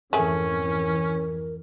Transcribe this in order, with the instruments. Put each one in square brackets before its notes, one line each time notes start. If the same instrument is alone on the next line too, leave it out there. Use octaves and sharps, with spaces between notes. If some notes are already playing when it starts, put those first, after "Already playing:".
[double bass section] F2 G#2 E3 [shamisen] A3 G#4 [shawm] C#4 [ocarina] A#4